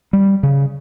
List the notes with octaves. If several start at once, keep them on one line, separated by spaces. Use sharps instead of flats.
G3
C#3